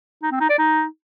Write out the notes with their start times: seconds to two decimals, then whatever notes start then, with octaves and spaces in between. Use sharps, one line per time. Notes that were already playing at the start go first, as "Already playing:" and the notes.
0.22 D#4
0.31 C4
0.40 D#4
0.49 D5
0.58 D#4